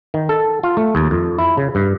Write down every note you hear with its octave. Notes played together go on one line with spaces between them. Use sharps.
D#3
A4
F4
A3
D#2
F2
E4
C#3
G2